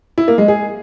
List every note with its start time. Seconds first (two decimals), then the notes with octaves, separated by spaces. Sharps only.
0.18 E4
0.28 A#3
0.38 G#3
0.48 G#4